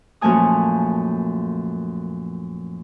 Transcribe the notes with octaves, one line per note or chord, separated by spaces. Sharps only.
F#2 A#2 F3 A3 G#5 D#6